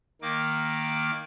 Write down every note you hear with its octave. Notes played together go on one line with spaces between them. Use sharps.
D#3 A#3 D6